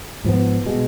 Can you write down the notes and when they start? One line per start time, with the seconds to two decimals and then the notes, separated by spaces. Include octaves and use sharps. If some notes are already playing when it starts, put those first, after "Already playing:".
0.24 G#2 F3 B3
0.66 B2 G#3